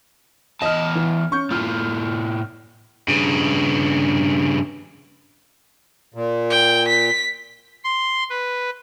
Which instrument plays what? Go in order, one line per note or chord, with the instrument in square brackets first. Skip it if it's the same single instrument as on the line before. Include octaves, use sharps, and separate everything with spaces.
[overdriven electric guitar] E2 A5 [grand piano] D#5 F6
[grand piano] E3
C#4 C#6 G6
[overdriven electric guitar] A2 F4 [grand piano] F6
[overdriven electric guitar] G2 C#3
[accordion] A#2
[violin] G5
B6
[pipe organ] C6
B4